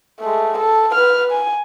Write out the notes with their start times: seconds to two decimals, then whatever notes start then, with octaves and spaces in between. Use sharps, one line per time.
0.20 G#3 A3
0.58 A4
0.94 B4 F6
1.32 G#5